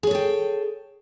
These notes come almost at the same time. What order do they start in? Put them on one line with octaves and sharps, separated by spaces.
G#4 C#5 A4 G5